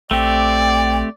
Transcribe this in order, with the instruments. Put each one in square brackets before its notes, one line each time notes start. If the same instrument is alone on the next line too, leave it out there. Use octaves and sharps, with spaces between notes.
[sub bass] A#1 [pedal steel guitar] A3 C4 G4 [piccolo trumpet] D5 [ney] G5